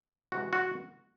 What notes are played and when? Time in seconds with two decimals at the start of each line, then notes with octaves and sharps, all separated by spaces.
0.32 C3 E3 G#3 F#4
0.53 F#4